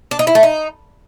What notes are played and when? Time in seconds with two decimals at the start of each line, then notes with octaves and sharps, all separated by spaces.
0.11 D4
0.19 D#4
0.27 E4
0.35 A3
0.43 D#4